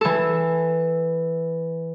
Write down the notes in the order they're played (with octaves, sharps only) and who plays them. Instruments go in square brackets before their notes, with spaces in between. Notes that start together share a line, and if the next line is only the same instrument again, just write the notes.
[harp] E3 A4